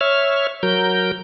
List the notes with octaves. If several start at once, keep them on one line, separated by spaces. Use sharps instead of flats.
C#5 E5 F6
F#3 A#4 G6